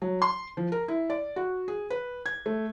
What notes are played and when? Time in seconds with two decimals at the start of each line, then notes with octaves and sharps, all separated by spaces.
0.02 F#3
0.22 C6
0.57 F3
0.72 A#4
0.88 E4
1.10 D5
1.36 F#4
1.68 G#4
1.90 B4
2.26 G#6
2.46 A3